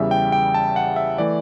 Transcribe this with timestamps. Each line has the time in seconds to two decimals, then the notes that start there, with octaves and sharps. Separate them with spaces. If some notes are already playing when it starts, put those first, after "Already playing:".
Already playing: E2 C#3 E3 G3 E5
0.11 G5
0.32 G5
0.54 A5
0.76 F#5
0.96 E5
1.18 E3 A3 D5